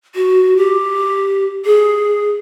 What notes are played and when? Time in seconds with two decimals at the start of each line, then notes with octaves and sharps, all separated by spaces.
0.15 F#4
0.57 G4
1.65 G#4